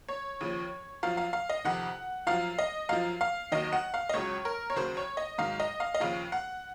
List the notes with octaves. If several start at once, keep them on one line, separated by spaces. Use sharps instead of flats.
C#5
D#2 C#3 F3
F#2 F3 F5
F5
F5
D#5
F2 C3 D#3 F#5
F#2 F3 F5
D#5
F#2 F3 F5
F5
D#2 D#3 F#3 D#5
F#5
F5
D#5
C#2 C#3 F#3 C#5
A#4
C#5
D#2 C#3 F#3 C5
C#5
D#5
G#2 D#3 F#3 F5
D#5
F5
D#5
D#2 C#3 F3 F5
F#5